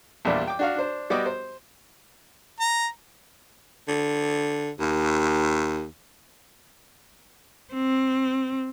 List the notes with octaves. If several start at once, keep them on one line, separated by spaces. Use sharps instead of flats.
A#1 E2 A#2 G3 D4 E5
G5 D6
D4 F#4 F5
D4 C5
G3 B3 F#4 G4 D#5 D6
C5
A#5
D3
D#2
C4